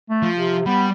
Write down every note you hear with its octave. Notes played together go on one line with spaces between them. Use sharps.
A3
F3
C3
G3 B3